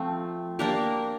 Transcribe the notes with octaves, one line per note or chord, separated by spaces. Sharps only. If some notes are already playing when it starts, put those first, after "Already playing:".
Already playing: F3 A3 C4
A#3 D4 G4 A#4